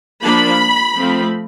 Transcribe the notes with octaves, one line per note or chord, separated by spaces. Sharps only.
F3 A#3 D4 B5
F3 A3 C4